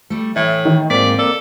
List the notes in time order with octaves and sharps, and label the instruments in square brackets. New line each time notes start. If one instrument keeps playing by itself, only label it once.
[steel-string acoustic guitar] G3 A3
[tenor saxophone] A2 [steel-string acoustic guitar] E3 [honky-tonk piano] E5
[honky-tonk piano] D#3
[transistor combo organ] G#2 A#3 [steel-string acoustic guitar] C4 F4 [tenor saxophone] D5 [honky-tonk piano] B6
[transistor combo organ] A#3 D5 [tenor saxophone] A4